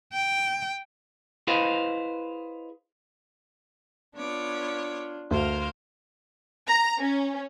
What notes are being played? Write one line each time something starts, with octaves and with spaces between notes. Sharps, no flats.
G5
E4 G#4 B4 C5 D#5 F5
B3 D4 F4 C#5 D6
D2 A#4 C5 F5
A#5
C#4